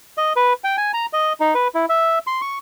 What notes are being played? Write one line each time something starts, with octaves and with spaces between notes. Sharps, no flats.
D#5
B4
G5
G#5
A#5
D#5
D#4
B4
E4
E5
C6
C#6